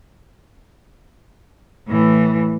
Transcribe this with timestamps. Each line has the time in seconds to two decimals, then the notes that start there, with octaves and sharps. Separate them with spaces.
1.87 A2 E3